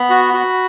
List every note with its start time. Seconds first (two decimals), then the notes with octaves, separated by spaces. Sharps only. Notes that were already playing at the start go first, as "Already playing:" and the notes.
Already playing: B3 B5
0.10 F#4
0.34 F#4